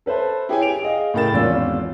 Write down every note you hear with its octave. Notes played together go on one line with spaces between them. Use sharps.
A4 B4 C5 E5 A5
E4 G4 G#4 C#5 G5 G#5
D7 F7
G#4 D#5 F5
A2 C#3 A#4 G5 A6 E7
G#1 E2 C#4 F4 D5 E6